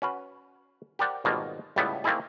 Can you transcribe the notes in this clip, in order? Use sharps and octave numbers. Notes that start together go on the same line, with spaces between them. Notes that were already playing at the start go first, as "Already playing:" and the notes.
C#4 F#4 B4
G4 A#4 C5 D5 F#5
G#1 B2 G3 A#3 F4
C#2 A2 G3 B3 E4 A4
A3 A#3 C4 D#4 E4 G#4